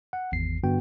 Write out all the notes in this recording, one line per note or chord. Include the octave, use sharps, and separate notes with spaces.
F#5
G#1 E2 C7
G2 D3 B3 F#4 G5